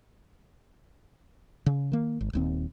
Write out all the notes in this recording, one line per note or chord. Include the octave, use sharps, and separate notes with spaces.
C#3
D#3 A#3
G#1
D#1 D#2 C4